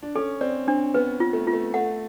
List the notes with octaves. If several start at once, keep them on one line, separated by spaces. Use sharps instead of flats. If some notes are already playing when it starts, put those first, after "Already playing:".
D4
C#4 A4
C4 D5
C4 D4
B3 B4
F4
A3
F4
A3
A3 F#5